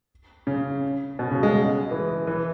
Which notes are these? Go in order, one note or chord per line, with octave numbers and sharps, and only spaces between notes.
C#3
B2
C#3
G#3
E3
E3